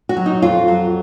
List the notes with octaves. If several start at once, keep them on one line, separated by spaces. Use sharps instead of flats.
F#4
F#3
D#4
F2 F4
F#3